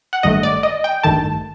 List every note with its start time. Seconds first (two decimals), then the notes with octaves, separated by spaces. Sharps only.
0.13 F#5
0.23 A1 G2 D#3 A3 D#5
0.43 D5
0.63 D#5
0.84 G5
1.03 A1 G2 D#3 A3 A5